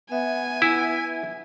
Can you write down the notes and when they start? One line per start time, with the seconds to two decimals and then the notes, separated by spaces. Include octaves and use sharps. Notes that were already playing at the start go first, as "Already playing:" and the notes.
0.12 B3 E5 G#5
0.62 E4